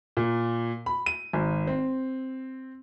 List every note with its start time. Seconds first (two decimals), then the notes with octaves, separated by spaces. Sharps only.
0.17 A#2
0.86 B5
1.06 D#7
1.33 G#1
1.67 C4